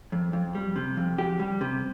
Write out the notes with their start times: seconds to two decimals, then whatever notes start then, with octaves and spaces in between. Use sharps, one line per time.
0.12 F2
0.33 F2
0.55 G3
0.76 C3
0.97 F2
1.18 F2 G4
1.40 G3
1.61 C3